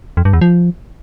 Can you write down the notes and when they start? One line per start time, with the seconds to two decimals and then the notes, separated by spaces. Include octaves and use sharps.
0.17 F2
0.25 G2
0.33 E2
0.41 F3